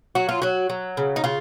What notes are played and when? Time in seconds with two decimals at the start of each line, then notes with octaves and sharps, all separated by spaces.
0.15 F#3 F#4
0.29 F4
0.42 F#3 F#4
0.70 F#3
0.97 C#3
1.16 D#4
1.24 C#3 F4